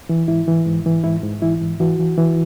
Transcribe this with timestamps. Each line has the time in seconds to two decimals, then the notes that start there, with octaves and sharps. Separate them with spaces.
0.09 E3
0.28 G#2 E4
0.47 E3
0.66 G#2
0.86 E3
1.04 G#2 E4
1.23 G#2
1.42 E3 E4
1.61 G#2
1.80 E3 F#4
1.99 E3
2.18 E3